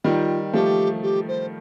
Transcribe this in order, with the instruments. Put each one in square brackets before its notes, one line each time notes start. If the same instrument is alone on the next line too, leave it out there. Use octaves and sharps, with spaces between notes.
[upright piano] D#3 G3 [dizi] F4
[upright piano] F3 A3 [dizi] G4
[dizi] G4
C5